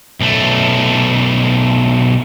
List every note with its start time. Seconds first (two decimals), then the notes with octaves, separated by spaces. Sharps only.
0.20 B1 A3